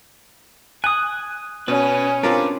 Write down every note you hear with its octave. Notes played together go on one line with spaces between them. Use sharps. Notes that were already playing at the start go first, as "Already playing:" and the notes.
G#5 D#6 F#6
B2 C#4 B4
C4 D4 F4 G4 A#4 B4